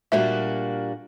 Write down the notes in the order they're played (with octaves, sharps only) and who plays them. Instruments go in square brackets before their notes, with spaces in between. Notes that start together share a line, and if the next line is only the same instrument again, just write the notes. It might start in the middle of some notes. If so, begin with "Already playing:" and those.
[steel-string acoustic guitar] A#2 G3 A#3 D4 F#4 [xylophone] E5